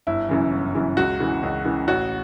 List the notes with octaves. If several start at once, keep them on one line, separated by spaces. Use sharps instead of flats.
G1 E4
F#2 C#3 E3
G1
F#2 C#3 E3
C#2 F#4
C#3 E3
C#2
C#3 E3
A1 F#4